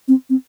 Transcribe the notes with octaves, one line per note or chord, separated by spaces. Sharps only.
C4
C4